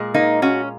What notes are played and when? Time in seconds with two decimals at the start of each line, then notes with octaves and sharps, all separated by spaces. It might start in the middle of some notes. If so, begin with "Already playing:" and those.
Already playing: A#2 G#3
0.14 A#3 D#4
0.42 C#4 F#4